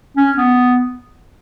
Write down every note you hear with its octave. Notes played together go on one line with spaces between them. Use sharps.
C#4
B3